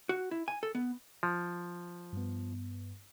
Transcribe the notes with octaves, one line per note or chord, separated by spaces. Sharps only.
F#4
E4
G#5
A4
B3
F3
G2 B3